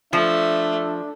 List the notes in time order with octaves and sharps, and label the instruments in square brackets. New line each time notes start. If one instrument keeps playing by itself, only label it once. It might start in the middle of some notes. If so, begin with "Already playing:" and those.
[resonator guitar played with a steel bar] F3 [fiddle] A3 [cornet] D4 [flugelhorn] E5